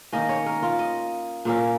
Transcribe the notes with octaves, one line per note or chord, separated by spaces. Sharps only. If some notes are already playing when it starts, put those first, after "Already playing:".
D#3 A#3 C#4 D#5
C#5
A#4
F4
D#5
A#2 A#3 C#4